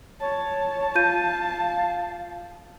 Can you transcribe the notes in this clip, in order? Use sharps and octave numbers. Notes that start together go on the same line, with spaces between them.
C#5 A5
F4 F5 G6 D#7